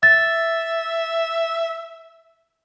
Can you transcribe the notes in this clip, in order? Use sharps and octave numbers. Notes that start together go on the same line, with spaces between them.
E5 A6